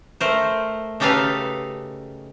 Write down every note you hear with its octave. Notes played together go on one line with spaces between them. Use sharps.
A3 A#4 C5
C#3 D#4 G4 A4 B4 F5